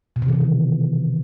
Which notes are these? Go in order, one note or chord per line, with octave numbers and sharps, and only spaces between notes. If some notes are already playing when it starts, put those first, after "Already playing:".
B2
C3
E3
B2
D#3